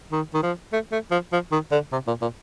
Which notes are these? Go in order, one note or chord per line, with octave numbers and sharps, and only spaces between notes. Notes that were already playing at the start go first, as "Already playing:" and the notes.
D#3
D#3
F3
A3
A3
F3
F3
D#3
D3
C3
A#2
A#2